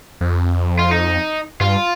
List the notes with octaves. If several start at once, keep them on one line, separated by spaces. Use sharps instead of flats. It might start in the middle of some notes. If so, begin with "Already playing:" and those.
F2
F4
D#4
G2 F4